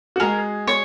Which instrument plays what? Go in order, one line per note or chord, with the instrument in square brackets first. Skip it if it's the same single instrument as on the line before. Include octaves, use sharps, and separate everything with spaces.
[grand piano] F#4
[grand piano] G#3 G#4 [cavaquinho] A#4
[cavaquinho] C#5